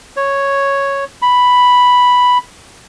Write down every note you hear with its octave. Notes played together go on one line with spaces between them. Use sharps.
C#5
B5